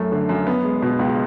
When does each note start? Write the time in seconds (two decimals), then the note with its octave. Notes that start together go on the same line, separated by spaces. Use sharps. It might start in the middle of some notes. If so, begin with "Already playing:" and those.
Already playing: F#2 A3
0.12 D3
0.29 F#2
0.47 B3
0.65 G#3
0.82 B2
0.99 C#2